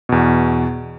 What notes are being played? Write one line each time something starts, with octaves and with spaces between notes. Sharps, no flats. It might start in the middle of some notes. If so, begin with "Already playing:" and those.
E2 B2